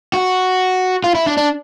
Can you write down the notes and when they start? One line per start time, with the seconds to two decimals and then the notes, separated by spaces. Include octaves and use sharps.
0.14 F#4
1.04 F4
1.15 E4
1.27 D4
1.38 D4